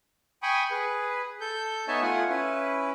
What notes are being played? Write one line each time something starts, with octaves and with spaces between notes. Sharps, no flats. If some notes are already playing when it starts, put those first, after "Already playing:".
G5 G#5 B5 C#6 D#6
G#4 B4
A4 G6
B3 D#4 C#5 E5 G#5 A5
A3 F4 F#5 G#5
C#4 E4 B4